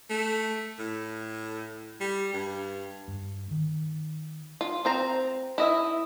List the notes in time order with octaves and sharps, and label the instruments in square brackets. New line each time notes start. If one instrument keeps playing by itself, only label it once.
[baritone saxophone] A3
A2
G3
G2
[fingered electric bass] G2
D#3
[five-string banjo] F4
C4 C5 A#5
E4 D#5 E5